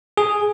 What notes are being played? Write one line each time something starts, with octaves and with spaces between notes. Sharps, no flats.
G#4